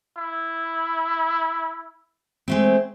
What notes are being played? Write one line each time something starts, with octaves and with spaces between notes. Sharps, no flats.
E4
G#3 A3 C4